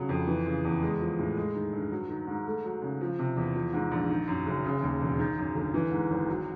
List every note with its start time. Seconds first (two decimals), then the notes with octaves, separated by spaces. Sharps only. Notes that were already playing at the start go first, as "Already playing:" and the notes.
Already playing: C#3 F#3
0.09 F2
0.27 E3
0.46 C#3
0.64 E2
0.82 G#3
1.00 F3
1.19 A2
1.37 G#3
1.54 D#3
1.73 G2
1.91 F#3
2.09 D#3
2.27 G#2
2.46 A3
2.64 F#3
2.82 C#3
3.01 F3
3.19 C3
3.36 E2
3.56 F3
3.73 G#2
3.91 A#1
4.10 D#3
4.27 F#2
4.46 F#1
4.64 C#3
4.82 D#2
5.01 E1
5.19 D#3
5.38 F#2
5.55 G1
5.74 E3
5.91 G#2
6.10 G#1
6.29 F#3